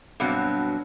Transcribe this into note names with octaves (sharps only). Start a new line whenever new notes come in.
G2 B2 F#3 C4